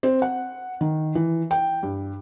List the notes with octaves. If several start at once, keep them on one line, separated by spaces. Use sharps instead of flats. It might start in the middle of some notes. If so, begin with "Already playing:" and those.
C4
F#5
D#3
E3
G5
G2